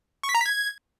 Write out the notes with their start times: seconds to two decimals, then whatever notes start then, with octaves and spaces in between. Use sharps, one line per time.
0.23 C#6
0.29 B6
0.35 A#5
0.40 B6
0.46 G#6